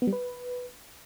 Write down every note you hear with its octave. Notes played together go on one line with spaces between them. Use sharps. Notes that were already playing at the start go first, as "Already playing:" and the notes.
B3
G3
B4